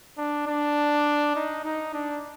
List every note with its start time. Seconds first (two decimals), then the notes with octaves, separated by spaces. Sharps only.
0.18 D4
0.47 D4
1.36 D#4
1.65 D#4
1.94 D4